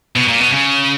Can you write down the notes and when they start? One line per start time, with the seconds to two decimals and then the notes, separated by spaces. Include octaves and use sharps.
0.16 B2
0.28 A#2
0.41 B2
0.53 C#3